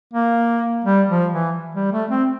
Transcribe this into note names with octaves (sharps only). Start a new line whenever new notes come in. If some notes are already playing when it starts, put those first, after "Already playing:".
A#3
G3
F3
E3
G3
A3
C4